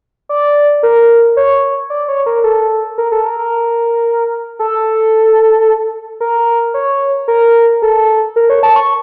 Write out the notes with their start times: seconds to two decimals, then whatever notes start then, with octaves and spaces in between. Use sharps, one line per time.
0.29 D5
0.83 A#4
1.37 C#5
1.90 D5
2.08 C#5
2.26 A#4
2.44 A4
2.98 A#4
3.12 A4
3.25 A#4
3.39 A#4
4.59 A4
6.21 A#4
6.74 C#5
7.28 A#4
7.82 A4
8.36 A#4
8.50 C#5
8.63 A5
8.76 C#6